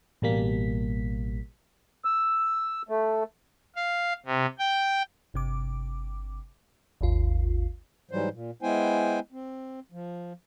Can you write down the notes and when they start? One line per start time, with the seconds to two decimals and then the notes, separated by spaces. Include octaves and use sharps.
0.22 A1 B2 G3 A#3 B6
2.05 E6
2.89 A3
3.76 F5
4.26 C3
4.59 G5
5.34 G1 C3 D6
7.01 G#1 D#2 F4
8.11 G#2 E3 F#3 G3 C5
8.33 A#2
8.62 G#3 B3 E4 C5 G5 G#5
9.32 C4
9.92 F3